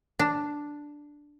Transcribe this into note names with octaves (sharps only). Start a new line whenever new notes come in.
D4